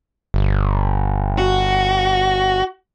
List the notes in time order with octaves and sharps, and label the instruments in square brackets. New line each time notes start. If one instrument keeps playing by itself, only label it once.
[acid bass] G1
[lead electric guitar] F#4